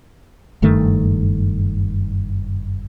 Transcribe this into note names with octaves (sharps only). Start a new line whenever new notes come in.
F#1 G2 D#3 A3